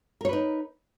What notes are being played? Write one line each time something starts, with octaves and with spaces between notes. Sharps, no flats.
D#4 A#4 B4 C#5